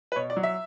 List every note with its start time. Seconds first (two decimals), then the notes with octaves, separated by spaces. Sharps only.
0.12 B4
0.16 B2 C#5
0.30 D5
0.37 F#3
0.43 E5